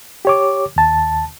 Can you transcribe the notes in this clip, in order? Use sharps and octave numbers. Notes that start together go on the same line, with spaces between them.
G4 C#5 D6
D#2 A5